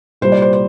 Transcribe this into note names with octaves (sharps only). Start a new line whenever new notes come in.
C2 A#2 G3 C5
D5
C5
C5